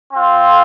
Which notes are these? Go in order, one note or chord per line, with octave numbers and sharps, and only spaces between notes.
C4 F4